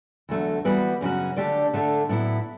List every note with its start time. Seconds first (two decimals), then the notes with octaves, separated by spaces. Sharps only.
0.29 E2 D3 F#3 A3
0.64 E3 G3 B3 F#4 B4
1.01 F#2 C#3 F#3 C#4 F#4
1.36 D3 A3 D4 G4 D5
1.73 D3 A3 D4 A4
2.09 A2 F#3 B3 E4